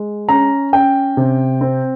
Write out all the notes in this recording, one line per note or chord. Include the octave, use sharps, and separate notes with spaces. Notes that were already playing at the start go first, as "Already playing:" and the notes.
Already playing: G#3
C#4 A#5
C#4 G5
C3
C4